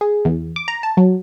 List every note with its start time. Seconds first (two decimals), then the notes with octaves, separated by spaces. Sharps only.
0.01 G#4
0.25 E2
0.56 D6
0.68 A#5
0.83 A5
0.97 F#3